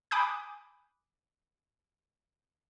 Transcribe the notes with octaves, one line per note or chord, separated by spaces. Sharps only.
G#5 B5 D6 D#6 F#6 G6